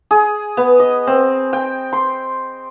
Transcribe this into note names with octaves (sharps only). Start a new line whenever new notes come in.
G#4
B3
D#5
C4
G5
C6